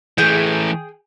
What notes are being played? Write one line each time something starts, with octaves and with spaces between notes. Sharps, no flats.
E3 A3 G#4 G5